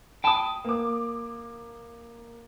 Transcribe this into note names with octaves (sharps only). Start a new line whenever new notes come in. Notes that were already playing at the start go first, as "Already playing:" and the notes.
G5 A5 B5 D#6
A#3 D6